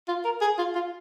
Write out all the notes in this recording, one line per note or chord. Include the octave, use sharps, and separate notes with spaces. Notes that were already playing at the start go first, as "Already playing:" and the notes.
F4
A#4
G#4
F4
F4